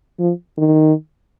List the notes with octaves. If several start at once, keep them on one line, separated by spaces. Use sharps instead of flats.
F3
D#3